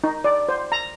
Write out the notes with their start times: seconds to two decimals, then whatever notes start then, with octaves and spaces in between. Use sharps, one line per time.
0.04 D#4
0.24 D5
0.49 C5
0.72 A#5